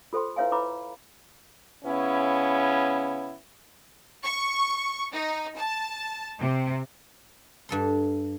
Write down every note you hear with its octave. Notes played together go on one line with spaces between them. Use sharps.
F4 A4 C5 G5 C6
E4 B4 C#5 E5 F5 G#5
E4 B4 C#5 A#5 B5 D6
C#3 B3 C#4 E4
C#6
D#4
A5
C3
G2 A4 C6